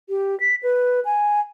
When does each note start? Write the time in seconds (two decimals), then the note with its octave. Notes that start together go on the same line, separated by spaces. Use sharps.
0.10 G4
0.40 B6
0.63 B4
1.05 G#5